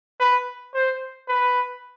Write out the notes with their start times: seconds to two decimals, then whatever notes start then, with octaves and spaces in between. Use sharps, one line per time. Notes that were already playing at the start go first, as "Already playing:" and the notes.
0.20 B4
0.74 C5
1.28 B4